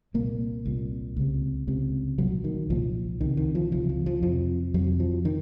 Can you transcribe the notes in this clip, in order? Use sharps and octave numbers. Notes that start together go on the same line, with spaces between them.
C2 A#2 A#3
C2 A#2
C#2 C3
C#2 C3
C2 A#2 F#3
D#3
C2 A#2 F3
C#2 C3 D#3
D#3
F3
C#2 C3 F3
F3
F3
F2 C3 F3
F2 C3 F#3
F3
D#3